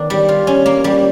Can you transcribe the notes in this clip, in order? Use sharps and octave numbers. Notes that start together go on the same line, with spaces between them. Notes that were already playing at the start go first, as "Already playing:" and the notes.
Already playing: D#3 B3 D4
G3
F4
C#4
A#3
G3